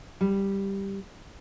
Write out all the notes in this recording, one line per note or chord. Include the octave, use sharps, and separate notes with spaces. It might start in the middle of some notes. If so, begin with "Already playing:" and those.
G3